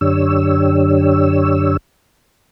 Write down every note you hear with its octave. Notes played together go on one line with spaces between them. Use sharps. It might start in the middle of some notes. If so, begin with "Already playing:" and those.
F#2 D3 D4 G4 C#5 E6